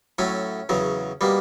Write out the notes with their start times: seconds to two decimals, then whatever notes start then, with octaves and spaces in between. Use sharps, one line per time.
0.18 A2 F#3 A3 C#4
0.69 E2 C#3 F#3
1.21 B2 G3 A#3